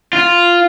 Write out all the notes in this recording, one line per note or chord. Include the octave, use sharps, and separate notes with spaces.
F4